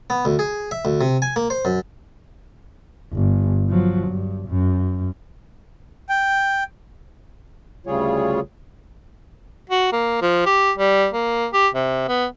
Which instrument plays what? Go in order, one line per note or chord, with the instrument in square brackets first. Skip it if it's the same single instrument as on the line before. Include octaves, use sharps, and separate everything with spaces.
[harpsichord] B3
D2
G#4
E5
D2
C3
G#5
A#3
C5
F#2
[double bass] G1
F3 F#3
G2
F#2
[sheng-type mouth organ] G5
[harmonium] D2 C#3 G3 F4 G#4 C#5
[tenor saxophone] F#4
A#3
F3
G4
G3
A#3
G4
C3
B3